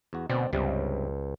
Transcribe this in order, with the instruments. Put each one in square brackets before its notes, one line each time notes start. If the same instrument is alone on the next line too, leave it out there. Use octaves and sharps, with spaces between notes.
[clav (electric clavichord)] E2 F#4
[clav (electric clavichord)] D2 C4 D5 [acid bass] B2
[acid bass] C#2 [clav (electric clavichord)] G2 C3 G3